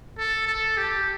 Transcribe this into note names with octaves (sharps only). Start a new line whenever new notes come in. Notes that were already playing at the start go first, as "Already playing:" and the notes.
A4
A4
G4